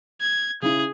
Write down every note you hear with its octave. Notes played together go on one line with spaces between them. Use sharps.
G#6
C#3 E4 G#4